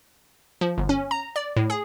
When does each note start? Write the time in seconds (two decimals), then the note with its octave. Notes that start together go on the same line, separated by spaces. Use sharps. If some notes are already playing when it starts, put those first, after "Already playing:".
0.61 F3
0.78 G1
0.89 C#4
1.11 A#5
1.36 D5
1.56 A2
1.70 G#4